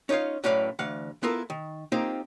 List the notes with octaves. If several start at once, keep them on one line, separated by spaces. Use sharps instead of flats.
C#4 D#4 F4 C#5 F5
F#2 A2 C#4 B4 D5 F5
D2 E3 F5 F#5
B3 E4 F4 A4 A#4
D#3
A#3 C4 D#4 F4 G4